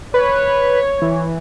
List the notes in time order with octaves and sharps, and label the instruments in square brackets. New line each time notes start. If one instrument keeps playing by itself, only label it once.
[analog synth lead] B4 [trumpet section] C#5
[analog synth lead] E3